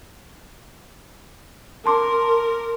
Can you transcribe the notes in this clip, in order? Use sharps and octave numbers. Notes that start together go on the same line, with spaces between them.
A#4 A5 C6 D6